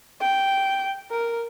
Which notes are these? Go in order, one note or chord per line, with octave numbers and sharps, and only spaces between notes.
G5
A#4